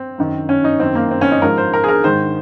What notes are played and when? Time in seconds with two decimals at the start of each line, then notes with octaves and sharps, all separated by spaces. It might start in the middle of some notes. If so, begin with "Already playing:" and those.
Already playing: C4
0.18 F#2 D#3
0.49 C#4
0.64 D#4
0.80 F#2 D#3 C4
0.95 A#3
1.11 C4
1.21 C#4
1.31 D#4
1.42 G#2 F3 A#4
1.58 C5
1.73 A#4
1.84 G#4
1.88 A#4
2.04 G#2 D#3 C5